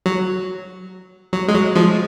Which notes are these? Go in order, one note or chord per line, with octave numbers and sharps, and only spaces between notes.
F#3
F#3
G#3
F#3
F3 G#3